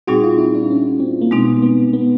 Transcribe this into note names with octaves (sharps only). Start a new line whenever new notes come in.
A#2 G3 C4 D#4 F#4 G#4
F4
E4
D4
C#4
C4
A#3
B2 G#3 B3 C4 D#4
B3
B3